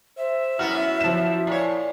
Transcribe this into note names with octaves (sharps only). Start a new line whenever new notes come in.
C5 E5
F#2 B3 E4 F#4 F6
F3 E7
A#2 C#5